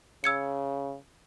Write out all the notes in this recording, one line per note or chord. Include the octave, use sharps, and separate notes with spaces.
C#3 E6 G#6 C#7